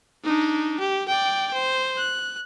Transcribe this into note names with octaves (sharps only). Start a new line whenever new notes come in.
D4 D#4
G4
D5 G5
C5
F#6